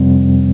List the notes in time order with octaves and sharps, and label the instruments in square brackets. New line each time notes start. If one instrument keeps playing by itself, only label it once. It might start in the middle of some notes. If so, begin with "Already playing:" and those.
Already playing: [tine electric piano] F2 C3 G3 C4